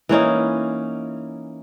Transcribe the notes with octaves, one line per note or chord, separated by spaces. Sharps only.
E3 A#3 C#4 D#4